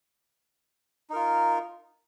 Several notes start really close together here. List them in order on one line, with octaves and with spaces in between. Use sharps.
D#4 A#4 F4